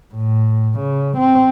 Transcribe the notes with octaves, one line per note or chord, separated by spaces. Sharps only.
A2
C#3
C4